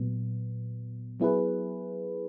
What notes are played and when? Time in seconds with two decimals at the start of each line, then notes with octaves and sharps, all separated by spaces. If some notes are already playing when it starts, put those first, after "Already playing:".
Already playing: A#2 F#3 B3
1.20 F#3 B3 E4 G#4 B4